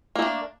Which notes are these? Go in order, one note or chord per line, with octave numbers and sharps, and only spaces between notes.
A3 A#3 D4